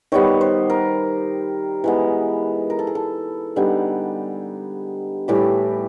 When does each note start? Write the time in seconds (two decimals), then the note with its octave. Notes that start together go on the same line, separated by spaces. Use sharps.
0.12 D#3 G3 B3 C#5
0.41 C5
0.70 A#4
1.84 E3 G#3 B3
2.70 A#4
2.79 A4
2.87 G#4
2.95 A4
3.56 D3 G3 B3 D#4 G#4
5.28 A2 E3 G3 G4